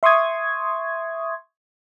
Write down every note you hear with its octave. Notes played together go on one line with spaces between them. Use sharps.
E5 C6 C#6 D#6 G#6